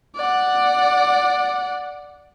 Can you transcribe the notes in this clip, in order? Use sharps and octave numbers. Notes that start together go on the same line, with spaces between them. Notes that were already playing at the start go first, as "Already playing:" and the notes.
D5 F#5